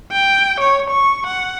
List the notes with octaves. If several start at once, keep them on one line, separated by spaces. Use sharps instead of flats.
G5
C#5
C#6
F#5